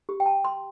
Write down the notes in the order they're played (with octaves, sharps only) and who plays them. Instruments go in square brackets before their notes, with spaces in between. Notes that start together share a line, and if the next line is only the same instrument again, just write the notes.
[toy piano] G4
G5
A5
C6